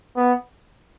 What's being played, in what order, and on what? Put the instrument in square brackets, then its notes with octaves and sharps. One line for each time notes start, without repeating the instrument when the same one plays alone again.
[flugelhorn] B3